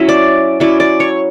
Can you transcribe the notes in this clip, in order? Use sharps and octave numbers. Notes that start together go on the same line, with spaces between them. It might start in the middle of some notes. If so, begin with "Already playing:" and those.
Already playing: F#3 C#4 E4 E5
D5
F#3 C#4 E4 D5
D5
C#5